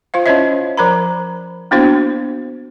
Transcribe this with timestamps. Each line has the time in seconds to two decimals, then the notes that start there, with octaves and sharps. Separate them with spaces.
0.14 F4 C5 F5
0.26 C#4 E4 C5 C#5 D#5 E5
0.77 F3 A#4 C5 A#5 B5
1.71 A#3 B3 D4 E4 F#4 C5